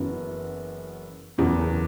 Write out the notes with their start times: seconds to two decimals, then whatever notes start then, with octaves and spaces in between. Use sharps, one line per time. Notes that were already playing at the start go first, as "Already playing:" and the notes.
Already playing: F#1 F#2 E3 B3 F#4
1.38 F#1 E2 C#3